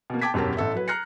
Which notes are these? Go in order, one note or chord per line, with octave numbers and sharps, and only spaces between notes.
B2 A#3
G5 A5 D6 G#6 B6
E1 F#2 G4 A#4 A5
A1 A4 E5
F#3 B4
A#5 F6 F#6 A#6 C7 C#7